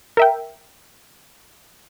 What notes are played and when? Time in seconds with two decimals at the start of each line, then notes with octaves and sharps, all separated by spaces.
0.17 A#4 E5 G5